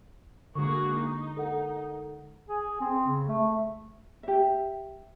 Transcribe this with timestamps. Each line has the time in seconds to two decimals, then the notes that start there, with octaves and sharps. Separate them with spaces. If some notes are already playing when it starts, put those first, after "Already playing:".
0.55 D3 G#3 A#3 F#4 G#4 C#6
0.95 D#4
1.37 A4 A#4 F#5
2.49 G#4
2.81 C4
3.07 C#3
3.28 A3
4.23 G4 E5